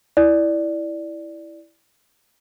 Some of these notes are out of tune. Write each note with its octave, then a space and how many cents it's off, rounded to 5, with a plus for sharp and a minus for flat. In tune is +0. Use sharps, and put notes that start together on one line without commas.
E4 +0 D5 +0